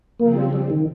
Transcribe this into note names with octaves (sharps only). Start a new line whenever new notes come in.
C#3 F3 A#3 C4
G3
G3
D#3